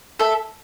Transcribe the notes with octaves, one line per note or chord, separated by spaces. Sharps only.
A4 E5